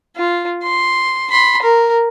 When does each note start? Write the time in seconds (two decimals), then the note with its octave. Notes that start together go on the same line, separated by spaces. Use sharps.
0.16 F4
0.63 C6
1.30 B5 C6
1.62 A#4